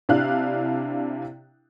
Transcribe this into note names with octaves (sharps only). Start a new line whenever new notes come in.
C3 D4 E4 F5 F#6